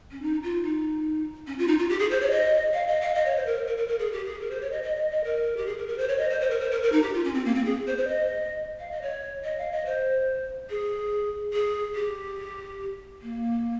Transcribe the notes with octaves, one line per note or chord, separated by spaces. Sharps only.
C#4
D#4
F4
D#4
C#4
F4
D#4
F4
G4
G#4
C5
C#5
D#5
F5
D#5
F5
D#5
C#5
C5
A#4
A#4
A#4
A#4
G#4
G4
G#4
A#4
C5
C#5
D#5
D#5
D#5
D#5
A#4
G4
G#4
A#4
A#4
C5
C#5
D#5
C5
C5
A#4
C5
A#4
A#4
D#4
G4
F4
C#4
C4
A#3
C4
G#4
C5
C5
D#5
F5
D#5
C#5
D#5
F5
D#5
C5
G#4
G#4
G4
A#3